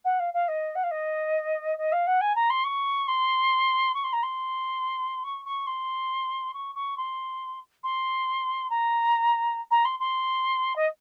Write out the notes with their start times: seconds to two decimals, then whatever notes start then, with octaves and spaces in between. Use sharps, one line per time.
0.05 F#5
0.20 F5
0.34 F5
0.48 D#5
0.75 F#5
0.83 F5
0.91 D#5
1.78 D#5
1.92 F5
2.07 F#5
2.21 G#5
2.35 A#5
2.50 C6
2.64 C#6
3.08 C6
3.94 C#6
4.04 C6
4.13 A#5
4.23 C6
5.24 C#6
5.45 C#6
5.67 C6
6.54 C#6
6.75 C#6
6.97 C6
7.84 C6
8.70 A#5
9.71 A#5
9.85 C6
10.00 C6
10.76 D#5